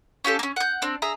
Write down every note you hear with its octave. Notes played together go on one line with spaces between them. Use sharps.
C#4 F4 G4 A4
A#3 C#4
F#5 G6
C4 D4
G#4 E5 A#5